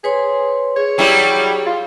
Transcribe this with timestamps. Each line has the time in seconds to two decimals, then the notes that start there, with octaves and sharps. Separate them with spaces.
0.04 G#4 B4 C#5 C6
0.76 G#4 C#5
0.98 F#3 G3 E4
1.66 F4